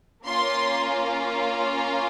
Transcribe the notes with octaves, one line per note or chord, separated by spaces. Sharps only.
A#3 C#4 F4 C6